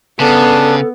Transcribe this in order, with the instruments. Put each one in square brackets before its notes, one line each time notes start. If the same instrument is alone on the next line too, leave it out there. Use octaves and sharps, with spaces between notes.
[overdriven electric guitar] C#3 [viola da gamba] B3 [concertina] D4 [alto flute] A4